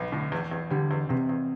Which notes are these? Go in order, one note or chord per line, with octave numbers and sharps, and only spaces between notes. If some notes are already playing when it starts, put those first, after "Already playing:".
Already playing: B1 B3
A2 D3
E2
E2
D3 G3
E2
E2 C3
E2